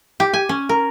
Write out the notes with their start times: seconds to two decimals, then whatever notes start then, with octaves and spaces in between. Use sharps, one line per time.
0.20 G4
0.34 G#5
0.49 C#4
0.69 A#4